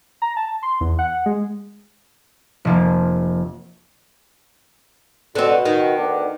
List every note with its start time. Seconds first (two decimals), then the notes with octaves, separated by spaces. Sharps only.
0.22 A#5
0.36 A5
0.63 C6
0.81 E2
0.99 F#5
1.26 G#3
2.65 F1 F3 A#3
5.35 B2 D3 C4
5.65 D#3
5.96 D2 B3 D4